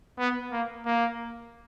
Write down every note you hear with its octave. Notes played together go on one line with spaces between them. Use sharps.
B3
A#3
A#3